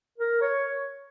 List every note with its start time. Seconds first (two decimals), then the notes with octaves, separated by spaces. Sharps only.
0.18 A#4
0.41 C#5